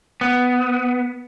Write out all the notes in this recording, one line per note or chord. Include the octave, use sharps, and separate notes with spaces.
B3